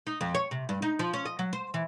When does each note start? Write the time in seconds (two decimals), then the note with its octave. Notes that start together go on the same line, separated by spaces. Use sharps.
0.07 D#4
0.21 F2
0.35 C#5
0.51 C3
0.69 G2
0.82 D#4
0.99 F3
1.13 C#4
1.25 D#5
1.39 F#3
1.53 C5
1.74 E3